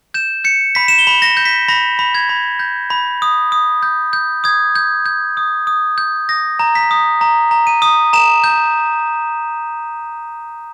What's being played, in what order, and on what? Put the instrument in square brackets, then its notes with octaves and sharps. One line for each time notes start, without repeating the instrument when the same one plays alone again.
[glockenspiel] G6 E7
G6 C#7
B5 B6
E7
G7
B5
A#6
G6
B6
B5 A#6
B5
G#6
B5
G6
B5
D#6
D#6
G6
G6
D#6 G#6
G6
G6
D#6
D#6
G6
D#6 A#6
A#5
B6
D#6
A#5
A#5
D#7
D#6
A#5 E7
G6